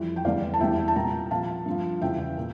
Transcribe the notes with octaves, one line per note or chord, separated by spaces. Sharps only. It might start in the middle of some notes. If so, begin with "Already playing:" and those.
Already playing: F2 E3 G3
G5
E2 D3 G3 D5 F5
A5
E2 E3 G3 E5 G5
A5
A#2 G3 G5 A#5
A#2 F3 F5 A5
G2 F3
E2 C#3 G3 E5 G5
A#2